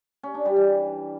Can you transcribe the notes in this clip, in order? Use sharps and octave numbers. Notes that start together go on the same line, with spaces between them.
C#4
D4
G3
E3